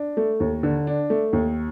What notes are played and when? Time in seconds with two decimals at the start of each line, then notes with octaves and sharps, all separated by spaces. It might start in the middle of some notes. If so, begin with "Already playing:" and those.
Already playing: D4
0.17 A3
0.40 D#2
0.63 D3
0.87 D4
1.10 A3
1.33 D#2